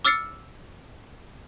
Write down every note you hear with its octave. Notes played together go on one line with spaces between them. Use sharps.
D6 E6 F6 A6 C7 C#7